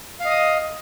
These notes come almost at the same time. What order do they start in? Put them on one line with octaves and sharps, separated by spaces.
F5 D#5 D#6